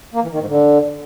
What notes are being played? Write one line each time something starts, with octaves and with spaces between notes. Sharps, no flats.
A#3
E3
D#3
G#2
D3